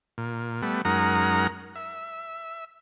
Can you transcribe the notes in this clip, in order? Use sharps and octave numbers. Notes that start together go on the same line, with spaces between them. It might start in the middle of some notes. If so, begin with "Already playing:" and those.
A#2
G3 A3 B3
F#2 G#3 D#4 A#4 F#5 A#5
E5